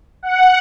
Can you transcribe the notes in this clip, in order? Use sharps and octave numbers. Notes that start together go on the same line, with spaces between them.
F#5